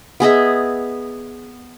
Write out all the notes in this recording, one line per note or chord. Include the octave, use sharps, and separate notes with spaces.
B3 G#4 D#5 E5